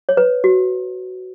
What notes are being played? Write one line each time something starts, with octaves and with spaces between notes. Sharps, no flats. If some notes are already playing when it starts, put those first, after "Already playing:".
C#5
B4
F#4